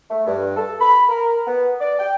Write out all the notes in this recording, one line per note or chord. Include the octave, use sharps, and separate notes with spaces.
A3
G2
A4
B5
A#4
B3
D5
G5